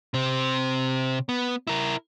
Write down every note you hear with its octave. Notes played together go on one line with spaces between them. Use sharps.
C3 C4
B3
E4 A#4